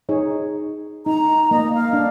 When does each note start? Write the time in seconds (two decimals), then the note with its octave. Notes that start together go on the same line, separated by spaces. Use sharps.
0.09 D#4 G#4 C#5
1.06 D#4 A#5
1.51 A#3 D#5
1.74 F5
1.93 D4